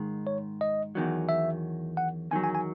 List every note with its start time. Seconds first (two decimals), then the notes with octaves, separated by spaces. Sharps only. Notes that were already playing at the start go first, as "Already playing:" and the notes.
Already playing: G#2 D#3 G#3
0.27 C#5
0.61 D#5
0.95 E2 D#3 F#3
1.29 E5
1.97 F#5
2.31 E2 D#3 F#3 G#5
2.44 G#5
2.55 G#5